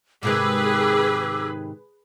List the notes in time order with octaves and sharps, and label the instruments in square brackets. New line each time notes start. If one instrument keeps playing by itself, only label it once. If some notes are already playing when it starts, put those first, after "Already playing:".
[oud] G#2 C3 D#3 [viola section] G#4 B4 [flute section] D6 E6